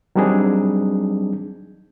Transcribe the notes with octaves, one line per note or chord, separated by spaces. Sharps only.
F#3 G3 C4 D4 D#4 G#4